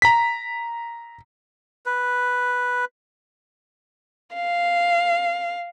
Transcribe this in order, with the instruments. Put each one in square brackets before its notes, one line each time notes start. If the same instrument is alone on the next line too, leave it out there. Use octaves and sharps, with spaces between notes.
[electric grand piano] A#5 B6
[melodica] B4
[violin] F5